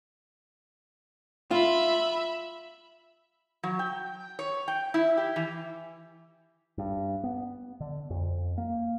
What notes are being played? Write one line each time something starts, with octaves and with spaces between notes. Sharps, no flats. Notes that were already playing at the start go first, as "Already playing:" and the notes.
F4 E5 B5
F#3
G5
C#5
G5
E4
G4
E3
G2
B3
D3
F2
A#3